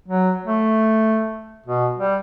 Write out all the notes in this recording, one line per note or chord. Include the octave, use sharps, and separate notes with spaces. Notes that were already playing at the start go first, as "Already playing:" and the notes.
F#3
A3
B2
G3